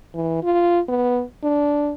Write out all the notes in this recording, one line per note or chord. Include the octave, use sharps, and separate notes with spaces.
E3
F4
B3
D4